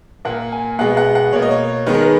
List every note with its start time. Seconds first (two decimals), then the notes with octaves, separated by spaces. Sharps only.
0.25 A#2 A#3 F#5
0.52 G#5
0.79 B2 G#3 B3 F#5
0.97 F#5
1.15 F#5
1.32 B2 A#3 C#5
1.42 D#5
1.51 C#5
1.86 D#3 G#3 B3 B4
1.94 A#4
2.02 B4